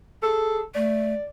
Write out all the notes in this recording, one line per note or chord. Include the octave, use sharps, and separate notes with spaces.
G#4 A4
A3 D5